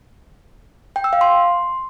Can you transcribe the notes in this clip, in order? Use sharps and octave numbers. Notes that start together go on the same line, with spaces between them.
G5
E6
F5
C6